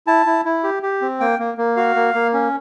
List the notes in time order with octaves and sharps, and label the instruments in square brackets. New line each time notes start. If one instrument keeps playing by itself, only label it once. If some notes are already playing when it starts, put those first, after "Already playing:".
[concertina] E4 A5
E4
E4
G4
G4
C4
A#3 G5
A#3
A#3
F#4 F5
A#3
A#3
C#4